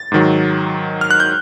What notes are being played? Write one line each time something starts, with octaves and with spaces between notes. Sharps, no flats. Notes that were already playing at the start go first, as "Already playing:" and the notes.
Already playing: A6
G#2 D#3 F#3
F6
F#6
G6